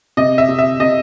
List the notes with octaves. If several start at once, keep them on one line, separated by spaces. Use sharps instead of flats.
C3 D#5
E5
C3
E5
C3 D#5